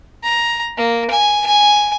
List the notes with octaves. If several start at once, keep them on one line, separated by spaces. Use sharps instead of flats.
A#5
A#3
G#5
G#5